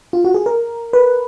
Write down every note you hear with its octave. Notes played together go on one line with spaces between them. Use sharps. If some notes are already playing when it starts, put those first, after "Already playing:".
F4
F#4
G#4
A#4
B4